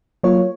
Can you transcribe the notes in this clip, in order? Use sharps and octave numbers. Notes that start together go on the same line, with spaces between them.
F#3 A#3 F4 C#5